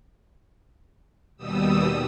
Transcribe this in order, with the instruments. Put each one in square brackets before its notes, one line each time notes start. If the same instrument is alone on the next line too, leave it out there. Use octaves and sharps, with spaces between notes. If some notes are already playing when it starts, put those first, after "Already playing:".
[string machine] D#2 B2 G3 D#6 E6